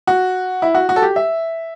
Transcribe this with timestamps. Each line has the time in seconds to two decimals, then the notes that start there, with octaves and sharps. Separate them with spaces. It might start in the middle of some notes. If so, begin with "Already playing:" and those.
0.07 F#4
0.62 E4
0.74 F#4
0.89 F#4
0.96 A4
1.02 G4
1.16 E5